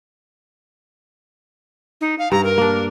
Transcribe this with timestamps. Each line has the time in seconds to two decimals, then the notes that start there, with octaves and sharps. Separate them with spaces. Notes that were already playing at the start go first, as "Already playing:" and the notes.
2.01 D#4
2.19 F5
2.32 G2 A#5
2.44 A#4
2.58 A#3 D4